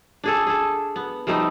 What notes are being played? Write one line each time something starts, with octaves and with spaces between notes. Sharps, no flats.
D4 G#4 A4
G#4 A4
B3
F3 G3 A3 D#4